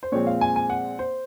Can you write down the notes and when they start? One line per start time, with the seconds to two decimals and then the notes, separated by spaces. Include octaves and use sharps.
0.03 C5
0.12 A#2 F3 G#3 C4 C#5
0.27 F5
0.41 G#5
0.56 G#5
0.69 F#5
0.99 C5